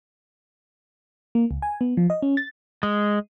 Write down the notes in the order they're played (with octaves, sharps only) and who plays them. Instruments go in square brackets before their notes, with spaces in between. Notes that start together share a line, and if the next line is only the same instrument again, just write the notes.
[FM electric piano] A#3
C#2
G#5
B3
F3
D#5
C#4
A6
[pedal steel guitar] G#3